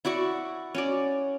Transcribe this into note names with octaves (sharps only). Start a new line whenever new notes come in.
E4 F#4 D5 C#6
C#4 F#4 D5